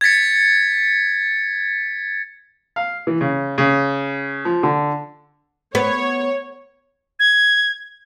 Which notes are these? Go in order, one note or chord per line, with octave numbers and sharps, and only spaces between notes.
G#6 A6 B6 C#7
F5
E3
C#3
C#3
F3
D3
B3 C#5
G#6